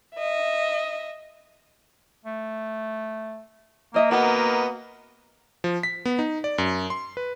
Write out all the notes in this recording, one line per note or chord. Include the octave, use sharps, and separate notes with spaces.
D#5 E5
A3
A#3 C5 D#5 E5
B3 F#4 A#4 D#5 F#5
F3
B6
B3
D#4
D5
F#2
C6
B4